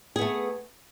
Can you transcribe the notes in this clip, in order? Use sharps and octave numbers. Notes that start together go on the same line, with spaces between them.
A3 B3 G#4